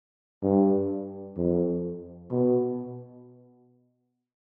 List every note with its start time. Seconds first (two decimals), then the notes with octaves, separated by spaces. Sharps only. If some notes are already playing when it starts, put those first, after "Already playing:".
0.43 G2
1.37 F2
2.31 B2